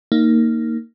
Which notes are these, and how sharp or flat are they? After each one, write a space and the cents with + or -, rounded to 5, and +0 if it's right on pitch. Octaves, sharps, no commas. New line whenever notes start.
A#3 -15 D#4 +5